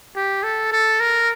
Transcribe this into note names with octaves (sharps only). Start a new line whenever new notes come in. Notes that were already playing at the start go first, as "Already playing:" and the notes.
G4
A4
A4
A#4